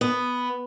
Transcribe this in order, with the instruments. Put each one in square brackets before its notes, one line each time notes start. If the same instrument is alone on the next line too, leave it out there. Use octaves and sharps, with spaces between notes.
[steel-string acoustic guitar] B3